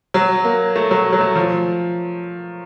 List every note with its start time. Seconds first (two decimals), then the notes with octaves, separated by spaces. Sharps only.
0.14 F#3
0.45 A#3
0.76 A3
0.91 F#3
1.13 F#3
1.21 A3
1.36 F3